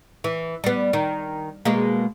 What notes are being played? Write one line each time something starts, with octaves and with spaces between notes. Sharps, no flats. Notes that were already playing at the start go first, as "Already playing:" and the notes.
E3
G3 B3
D#3
B2 G#3 A#3